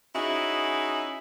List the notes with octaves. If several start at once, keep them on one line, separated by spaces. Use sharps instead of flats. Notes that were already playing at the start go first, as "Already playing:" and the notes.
C#4 D#4 E4 F#4 G#4